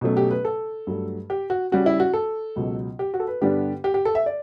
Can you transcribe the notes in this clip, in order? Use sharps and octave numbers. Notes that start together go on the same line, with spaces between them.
B2 F#3 A3 C#4
G4
B4
A4
G2 F#3 A3
G4
F#4
C#3 G3 C#4 F#4
E4
F#4
A4
C#2 B2 F#3
G4
F#4
A4
B4
G2 D3 G3 B3 D4 G4
G4
G4
A4
E5
D5